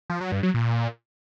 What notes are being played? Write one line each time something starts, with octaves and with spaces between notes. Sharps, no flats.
F3
F#3
G2
F#3
A#2